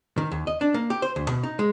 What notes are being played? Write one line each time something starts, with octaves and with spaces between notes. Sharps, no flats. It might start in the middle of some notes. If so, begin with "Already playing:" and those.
D#3
D#2
D#5
D4
A#3
G4
C5
D2
B2
D#4
G#3